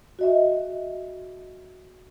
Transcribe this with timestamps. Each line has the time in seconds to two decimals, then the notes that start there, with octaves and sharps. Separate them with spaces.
0.19 F#4 D#5 E5